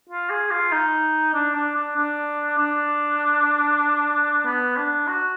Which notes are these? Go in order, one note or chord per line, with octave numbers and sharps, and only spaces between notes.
F4
G#4
F4
D#4
D4
D4
D4
D4
D4
B3
D4
F#4